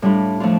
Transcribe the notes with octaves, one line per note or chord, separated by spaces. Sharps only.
A2 G3 D4 F4
F3 A3 D4 F4